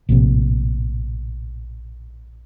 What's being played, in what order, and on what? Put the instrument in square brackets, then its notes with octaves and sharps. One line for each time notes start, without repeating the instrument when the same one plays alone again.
[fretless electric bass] A#1 A2 C3